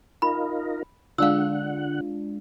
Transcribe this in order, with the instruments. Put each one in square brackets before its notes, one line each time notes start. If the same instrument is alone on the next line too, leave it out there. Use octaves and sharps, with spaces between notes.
[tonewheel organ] D#4 F4 A#4 [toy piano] B5
[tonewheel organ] D3 F#5 [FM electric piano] G#3 D4 F4 [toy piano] F5 E6